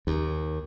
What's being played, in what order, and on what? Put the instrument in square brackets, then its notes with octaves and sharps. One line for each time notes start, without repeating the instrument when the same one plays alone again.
[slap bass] D#2